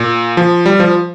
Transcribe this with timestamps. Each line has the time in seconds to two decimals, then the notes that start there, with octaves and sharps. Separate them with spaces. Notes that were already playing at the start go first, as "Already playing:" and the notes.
Already playing: A#2
0.37 F3
0.66 G3
0.80 F3